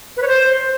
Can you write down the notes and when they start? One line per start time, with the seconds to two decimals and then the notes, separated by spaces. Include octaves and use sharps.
0.17 B4
0.22 C#5
0.28 C5